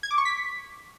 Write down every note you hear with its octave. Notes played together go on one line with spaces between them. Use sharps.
G#6
D6
C#6
B6